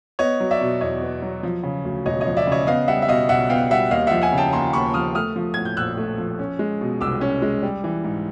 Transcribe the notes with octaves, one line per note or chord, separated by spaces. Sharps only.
B3 C#5 D#5
F#3
D5 E5
B2
E2 C#5 D#5
B3
F#3
F3
C#3
D2
E1 C#5 D#5
F3 C#5 D#5
D5 E5
C#3 C#5 D#5
B3 D#5 F5
G3 E5 F#5
E5
B2 D#5 F5
B1 E5 F#5
B3 F5 G5
G3 E5 F#5
D#2 D#5 F5
F3 E5 F#5
F#5 G#5
C#3
G5 A5
D#2 A#5 C6
D#2 B5 C#6
F3 D#6 F6
A3 D#6 F6
F3
A2 G#6
G6
A#1 E6 F#6
A3
F3
C#4
G#3
B2
C2 D6 E6
C#4
G#3
G3
E3
G#2